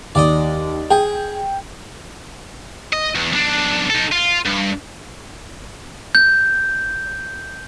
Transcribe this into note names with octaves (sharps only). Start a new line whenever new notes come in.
D#2 D5 D#5
G#4 G5
D#5
E2
B1 D4
D#4 A4
F4
G2
G6